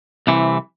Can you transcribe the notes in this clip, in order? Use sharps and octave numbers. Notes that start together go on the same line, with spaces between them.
C2 C3 E3